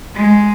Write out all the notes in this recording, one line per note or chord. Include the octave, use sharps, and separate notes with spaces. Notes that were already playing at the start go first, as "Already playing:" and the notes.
G#3